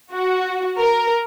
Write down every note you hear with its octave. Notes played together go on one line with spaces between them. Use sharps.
F#4
A#4